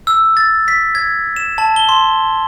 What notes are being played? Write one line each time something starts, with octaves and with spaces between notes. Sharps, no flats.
E6
A6
B6
G#6
E7
A5
G7
C6